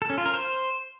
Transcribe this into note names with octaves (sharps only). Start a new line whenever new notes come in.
A4
C#4
F4
A#4
C5